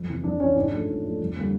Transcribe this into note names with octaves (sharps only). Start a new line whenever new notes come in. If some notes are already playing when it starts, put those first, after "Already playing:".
Already playing: F2
C3 E3
F2 D4 D5
C3 E3 C#4 C#5
G#2 D4 D5
F3 A3
G#2
F3 A3
F2
D3 G3 A#3